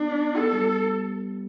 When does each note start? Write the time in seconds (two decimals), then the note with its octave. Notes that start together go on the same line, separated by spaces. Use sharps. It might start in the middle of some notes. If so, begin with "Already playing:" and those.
Already playing: B3 D4
0.37 B3 A4
0.52 G3